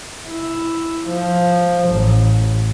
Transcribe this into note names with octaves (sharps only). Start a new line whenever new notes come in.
E4
F3
A1